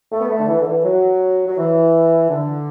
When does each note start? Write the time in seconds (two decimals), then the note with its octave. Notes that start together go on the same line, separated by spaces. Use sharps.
0.12 A3
0.21 B3
0.30 A3
0.39 D3
0.48 E3
0.61 D3
0.67 E3
0.84 F#3
1.47 F#3
1.58 E3
2.30 D3